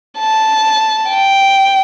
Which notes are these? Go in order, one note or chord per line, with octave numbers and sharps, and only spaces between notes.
A5
G5